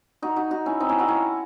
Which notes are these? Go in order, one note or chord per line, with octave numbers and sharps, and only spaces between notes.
D#4 F#4
D#4 F#4
D#4 F#4
C#4 E4
C4 D#4
C#4 E4
D#4 F#4
C#4 E4